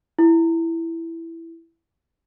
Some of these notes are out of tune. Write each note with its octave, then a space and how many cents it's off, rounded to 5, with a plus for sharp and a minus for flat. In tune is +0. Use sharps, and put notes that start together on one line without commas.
E4 +5